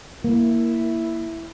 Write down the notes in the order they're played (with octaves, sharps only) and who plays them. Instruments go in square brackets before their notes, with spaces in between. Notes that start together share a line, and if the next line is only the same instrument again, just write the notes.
[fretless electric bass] A#3 [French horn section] E4